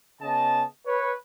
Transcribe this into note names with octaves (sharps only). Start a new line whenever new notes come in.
C#3 B3 D#5 A5
B4 C#5